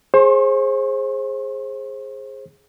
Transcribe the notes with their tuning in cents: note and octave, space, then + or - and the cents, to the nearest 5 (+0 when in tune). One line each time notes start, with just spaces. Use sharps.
G#4 +0 C5 +25 C#6 -40